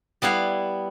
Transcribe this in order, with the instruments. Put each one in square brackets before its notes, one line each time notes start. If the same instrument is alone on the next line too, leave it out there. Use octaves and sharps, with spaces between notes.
[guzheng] G3 B3 E4 F5